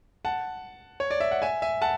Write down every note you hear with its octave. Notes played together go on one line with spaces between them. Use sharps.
F#5 A5
C#5
D5
E5
F#5
E5 G#5
E5 G#5
F#5 A5